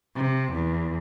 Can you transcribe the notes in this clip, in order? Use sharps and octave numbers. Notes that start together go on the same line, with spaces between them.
C3
E2